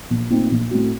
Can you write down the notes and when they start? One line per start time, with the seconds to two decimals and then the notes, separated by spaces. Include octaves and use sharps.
0.10 A#1
0.30 A#2 A3 C4 D#4
0.51 A#1
0.71 A2 A3 C4 F#4